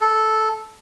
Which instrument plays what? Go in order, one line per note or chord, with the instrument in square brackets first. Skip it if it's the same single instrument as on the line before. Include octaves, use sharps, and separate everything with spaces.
[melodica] A4